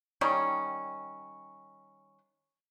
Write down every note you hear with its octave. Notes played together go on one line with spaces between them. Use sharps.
D#3 G3 C#4